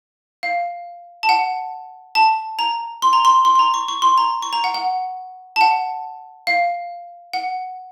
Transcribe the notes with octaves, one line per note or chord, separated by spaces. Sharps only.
F5
A5
F#5
A5
A#5
C6
A#5
C6
C6
C6
A#5
C#6
C#6
C6
A#5
C#6
A#5
F#5
F#5
A5
F#5
F5
F#5